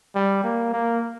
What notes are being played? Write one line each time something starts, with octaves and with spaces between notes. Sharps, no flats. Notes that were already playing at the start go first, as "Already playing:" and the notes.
G3
A#3
A#3